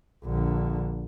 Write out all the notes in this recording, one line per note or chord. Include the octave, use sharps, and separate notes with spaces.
A#1 D3